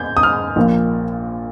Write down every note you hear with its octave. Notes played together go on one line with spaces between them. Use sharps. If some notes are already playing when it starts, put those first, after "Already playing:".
Already playing: G6 G#6
D#6
F6
A#1 A#2